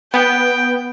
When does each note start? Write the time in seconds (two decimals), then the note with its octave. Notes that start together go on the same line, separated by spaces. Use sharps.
0.14 B3 G5